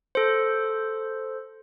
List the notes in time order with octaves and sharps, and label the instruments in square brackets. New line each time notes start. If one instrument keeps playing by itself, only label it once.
[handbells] A4 C5